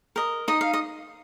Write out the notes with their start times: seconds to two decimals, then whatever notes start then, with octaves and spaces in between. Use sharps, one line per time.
0.16 A#4 D#5
0.48 D#4 D#5
0.61 F5
0.73 D#5